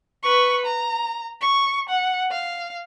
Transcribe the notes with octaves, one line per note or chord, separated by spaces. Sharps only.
B4 C#6
A#5
C#6
F#5
F5